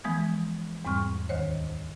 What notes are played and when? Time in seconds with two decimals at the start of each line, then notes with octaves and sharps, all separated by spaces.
0.04 E3 F3 G#3 B3 D#6 G#6
0.85 E2 G#2 G3 C4 C#6 F6
1.29 D2 D#3 C5 C#5